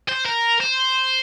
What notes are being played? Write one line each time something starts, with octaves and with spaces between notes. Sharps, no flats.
C5
A#4
C5